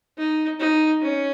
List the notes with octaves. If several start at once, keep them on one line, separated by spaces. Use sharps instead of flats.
D#4
D#4
C#4